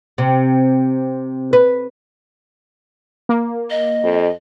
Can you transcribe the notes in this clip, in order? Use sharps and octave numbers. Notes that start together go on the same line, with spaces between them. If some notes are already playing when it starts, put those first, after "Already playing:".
C3
B4
A#3
D#5
F2